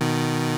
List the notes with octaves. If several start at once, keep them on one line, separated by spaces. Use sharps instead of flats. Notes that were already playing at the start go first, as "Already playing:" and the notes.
B2 D#3